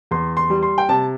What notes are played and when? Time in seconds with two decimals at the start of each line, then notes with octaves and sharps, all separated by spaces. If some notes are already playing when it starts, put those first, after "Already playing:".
0.11 E2 C6
0.37 C6
0.50 G3
0.63 C6
0.78 G5
0.89 C3 A5